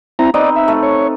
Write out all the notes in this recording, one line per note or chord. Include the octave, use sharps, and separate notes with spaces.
C4 E4 A#5
C4 D#4 B4 D5 D#5
E5
A3
C#5